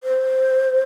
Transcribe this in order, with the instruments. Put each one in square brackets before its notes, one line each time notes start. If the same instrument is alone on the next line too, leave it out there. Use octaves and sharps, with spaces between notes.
[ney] C5